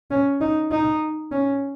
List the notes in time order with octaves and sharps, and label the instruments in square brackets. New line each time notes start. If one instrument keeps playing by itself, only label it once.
[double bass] C#4
D#4
D#4
C#4